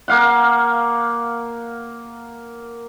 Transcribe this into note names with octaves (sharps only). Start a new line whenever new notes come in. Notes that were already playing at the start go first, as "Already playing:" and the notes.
A#3 F5 F#5